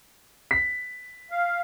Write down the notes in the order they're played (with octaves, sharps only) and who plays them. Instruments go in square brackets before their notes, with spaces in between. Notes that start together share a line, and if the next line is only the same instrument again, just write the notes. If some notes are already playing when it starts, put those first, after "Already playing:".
[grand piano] B6
[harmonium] F5